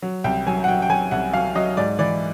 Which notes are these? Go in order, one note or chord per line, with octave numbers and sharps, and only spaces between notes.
F#3
C2 G5
F#3 G#5
F#5
F#3 G5
G5
F#3 G#5
C2 F#5
F#3 F5
F#3 D#5
G#2 D5
E3 D5